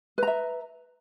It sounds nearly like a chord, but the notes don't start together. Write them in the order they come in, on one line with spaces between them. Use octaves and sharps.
B4 A#5 E5